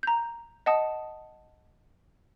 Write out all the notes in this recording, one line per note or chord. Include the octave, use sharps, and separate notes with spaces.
A#5 G6
D#5 F#5 A5 D#6